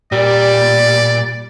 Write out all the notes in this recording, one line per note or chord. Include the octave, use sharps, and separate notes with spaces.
A#2 G3 D5